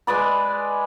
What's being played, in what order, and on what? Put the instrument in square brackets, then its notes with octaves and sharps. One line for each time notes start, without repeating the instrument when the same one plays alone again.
[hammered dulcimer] G#3 B4 D5 B5